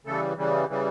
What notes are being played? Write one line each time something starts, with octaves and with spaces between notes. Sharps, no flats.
C#3 E3 G3 A3 A4
C#3 E3 G3
C#3 E3 G3